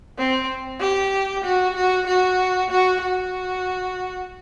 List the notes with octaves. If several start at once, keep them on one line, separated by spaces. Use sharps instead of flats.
C4
G4
F#4
F#4
F#4
F#4
F#4